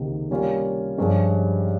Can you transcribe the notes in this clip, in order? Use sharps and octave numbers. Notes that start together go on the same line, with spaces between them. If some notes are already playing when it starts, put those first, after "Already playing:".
Already playing: C#2 C3 D#3 A#3
C3 G3 A#3 C#4 F4
G2 F3 G#3 C#4 G4